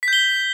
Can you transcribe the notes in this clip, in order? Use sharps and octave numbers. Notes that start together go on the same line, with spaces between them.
G6 B6 G7